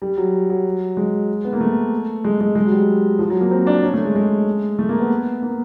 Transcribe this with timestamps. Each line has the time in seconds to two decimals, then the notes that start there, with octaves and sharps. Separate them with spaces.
0.02 G3
0.17 F#3
0.50 F#3
0.97 G#3
1.45 B3
1.53 A#3
1.60 A3
2.24 G#3
2.41 G#3
2.55 G#3
2.66 F#3
2.72 G3
3.19 F3
3.30 F#3
3.41 A#3
3.51 C4
3.67 D4
3.83 C#4
3.94 A3
4.05 G#3
4.15 G#3
4.79 A3
4.89 A#3
5.00 B3
5.42 A#3